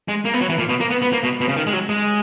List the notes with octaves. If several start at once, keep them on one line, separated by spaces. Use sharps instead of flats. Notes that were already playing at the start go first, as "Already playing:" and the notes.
G#3
A#3
B3
F#3
E3
A#2
B2
A#3
B3
B3
A#3
B2
B2
C#3
D#3
G#3
F#3
G#3